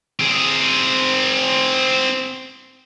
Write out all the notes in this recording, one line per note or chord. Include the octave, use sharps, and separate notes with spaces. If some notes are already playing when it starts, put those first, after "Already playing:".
C4 G#4